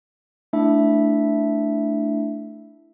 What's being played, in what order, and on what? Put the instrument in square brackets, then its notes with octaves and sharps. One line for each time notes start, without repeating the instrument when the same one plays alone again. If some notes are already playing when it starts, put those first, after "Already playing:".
[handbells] A3 D4 E4 E5